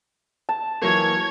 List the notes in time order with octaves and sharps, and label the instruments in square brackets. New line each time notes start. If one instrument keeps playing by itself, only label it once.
[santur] A5
[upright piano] E3 F#3 A#3 [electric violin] C#5 G#6